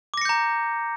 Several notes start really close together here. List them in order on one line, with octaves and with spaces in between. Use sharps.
D6 A#6 C#7 G6 A#5